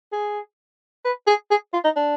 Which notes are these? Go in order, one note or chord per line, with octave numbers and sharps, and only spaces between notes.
G#4
B4
G#4
G#4
F4
D#4
D4